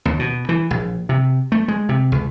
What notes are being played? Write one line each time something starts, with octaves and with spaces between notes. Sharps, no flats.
D#2
B2
E3
A#1
C3
A3
G#3
C3
C#2